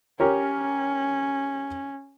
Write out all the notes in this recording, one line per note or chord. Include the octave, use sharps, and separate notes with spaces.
C#4 G4 A#4 C#5